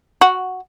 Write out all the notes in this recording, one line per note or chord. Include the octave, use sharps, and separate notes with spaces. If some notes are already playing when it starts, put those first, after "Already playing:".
F#4